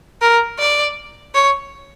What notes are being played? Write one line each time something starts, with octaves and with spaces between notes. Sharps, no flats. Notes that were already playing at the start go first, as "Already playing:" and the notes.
A#4
D5
C#5